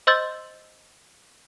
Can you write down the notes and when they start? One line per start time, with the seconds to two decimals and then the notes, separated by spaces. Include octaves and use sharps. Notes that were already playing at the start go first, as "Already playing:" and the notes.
0.07 C5 D#5 C6 E6 G6 A6